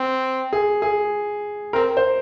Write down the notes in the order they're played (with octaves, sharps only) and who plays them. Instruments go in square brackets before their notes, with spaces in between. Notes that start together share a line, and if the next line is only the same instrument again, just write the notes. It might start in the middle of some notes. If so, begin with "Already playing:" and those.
Already playing: [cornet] C4
[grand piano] G#4
G#4
[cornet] C4 [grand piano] A#4
[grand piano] C5